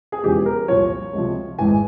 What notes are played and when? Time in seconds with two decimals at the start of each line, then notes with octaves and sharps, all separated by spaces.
0.12 G#4
0.23 E1 E2 C#3 F3 G4
0.46 A#4
0.68 C2 A#2 F3 C#5
1.13 C#2 C3 F3
1.59 G#1 G#2 E3 G#5